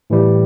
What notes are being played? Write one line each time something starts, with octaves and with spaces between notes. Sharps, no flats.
A2 E3 G3